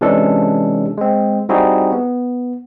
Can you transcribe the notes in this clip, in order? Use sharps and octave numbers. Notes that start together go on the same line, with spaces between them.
C3 E3 G#3 C#4 D4 A4
G#3 C4
G3 C4 D#4 E4 F#4 G#4
B3